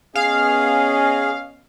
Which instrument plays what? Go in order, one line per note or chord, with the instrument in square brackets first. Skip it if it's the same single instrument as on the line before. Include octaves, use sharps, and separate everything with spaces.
[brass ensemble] B3 C#4 D#5 [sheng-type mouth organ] G#4 [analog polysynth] F5